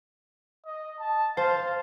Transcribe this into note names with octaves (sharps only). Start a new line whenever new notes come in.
D#5
A5
C5 F5 A5